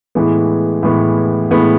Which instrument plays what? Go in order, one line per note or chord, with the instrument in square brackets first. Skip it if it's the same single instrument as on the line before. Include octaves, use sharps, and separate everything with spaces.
[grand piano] A2 E3 G#3 B3
A2 E3 G#3 B3
A2 E3 G#3 B3